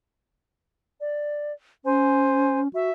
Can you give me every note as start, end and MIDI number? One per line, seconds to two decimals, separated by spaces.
1.01 1.52 74
1.85 2.68 61
1.85 2.59 72
1.85 2.59 80
2.73 2.90 66
2.73 2.92 76